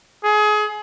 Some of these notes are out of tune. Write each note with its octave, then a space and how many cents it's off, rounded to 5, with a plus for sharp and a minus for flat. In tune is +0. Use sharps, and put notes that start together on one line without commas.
G#4 +30